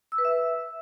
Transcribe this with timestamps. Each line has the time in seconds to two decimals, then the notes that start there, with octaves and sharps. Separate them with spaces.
0.12 E6
0.18 B4
0.25 E5